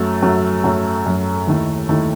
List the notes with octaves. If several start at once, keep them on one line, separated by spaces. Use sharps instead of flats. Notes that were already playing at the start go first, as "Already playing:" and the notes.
Already playing: F#2 F#3 A3
F#2 F#3 A3
F#2 F#3 A3
F#2 F#3 A3
D#2 D#3 A3 E4
D#2 D#3 A3 E4